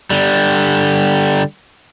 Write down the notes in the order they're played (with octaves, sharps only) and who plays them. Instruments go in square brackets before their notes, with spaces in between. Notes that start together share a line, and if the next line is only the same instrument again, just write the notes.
[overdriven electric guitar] D3 G3